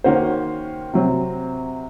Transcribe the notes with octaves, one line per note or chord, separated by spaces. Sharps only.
D#3 A#3 C#4 F#4 C5
C3 F#3 C4